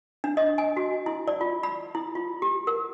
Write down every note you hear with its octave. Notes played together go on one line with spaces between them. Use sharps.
D4
D#5
G#5
F#4
E4
D5
F4
B5
E4
F4
G4
A#4